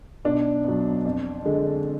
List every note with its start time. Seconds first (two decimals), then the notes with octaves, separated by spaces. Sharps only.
0.25 B1 D4
0.64 B2 F#3
1.05 F2
1.45 D3 G#3